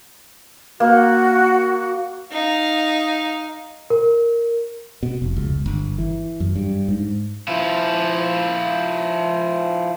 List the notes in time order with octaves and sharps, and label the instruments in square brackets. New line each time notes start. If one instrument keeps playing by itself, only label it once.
[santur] A#3 [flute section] F#4
[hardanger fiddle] D#4 F5
[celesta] A#4
[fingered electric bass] B2
F1
C#2
G1
E3
F#2
G2
G#2
[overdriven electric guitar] F3 E4